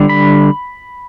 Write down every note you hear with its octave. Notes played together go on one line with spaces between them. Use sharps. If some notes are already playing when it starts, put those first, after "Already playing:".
Already playing: D3 G3 D4
B5